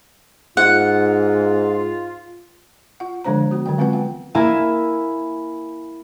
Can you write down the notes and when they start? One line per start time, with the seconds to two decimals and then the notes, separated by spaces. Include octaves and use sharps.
0.57 G#2 F4 F#5
3.00 F4 F#5
3.24 D3 F3 G#3 D4 C5 A#5
3.51 B3 F#4
3.66 D3 D#3 F#3 G5
3.78 G#3 C4 F4 B4 F#5
3.93 G5
4.35 A#3 E4 E5 G#5